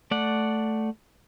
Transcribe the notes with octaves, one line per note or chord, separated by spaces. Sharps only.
A3 D5 F#5